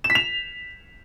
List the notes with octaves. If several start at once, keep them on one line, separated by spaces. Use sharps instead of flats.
E7
B6
F7